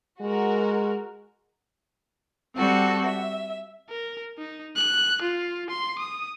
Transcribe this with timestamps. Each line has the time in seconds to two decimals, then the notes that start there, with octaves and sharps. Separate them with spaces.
0.21 G#3 F#4 A#4
2.56 G3 C4 F#4 A4
3.06 E5
3.90 A#4
4.38 D#4
4.76 F#6
5.22 F4
5.70 C6
5.99 D#6